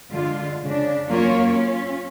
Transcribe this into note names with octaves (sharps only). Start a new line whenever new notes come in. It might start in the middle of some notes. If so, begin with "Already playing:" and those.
D3 G#3 F4
C#3 D4
F#3 A#3 C#4 F4 A#4 C#5
C#4 F4